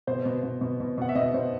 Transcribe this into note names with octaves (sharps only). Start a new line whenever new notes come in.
B2 C5
B2
B2
B2
B2
B2 F#5
E5
B2 D#5
B2 C5